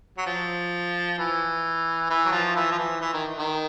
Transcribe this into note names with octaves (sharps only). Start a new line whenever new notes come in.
F#3
F3
E3
E3
F#3
F3
E3
F3
E3
E3
D#3
D#3